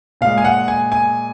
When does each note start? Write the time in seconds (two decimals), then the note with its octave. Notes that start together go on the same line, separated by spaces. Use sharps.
0.21 A#2 G#3 F5
0.38 G#5
0.45 F#5
0.68 G#5
0.92 G#5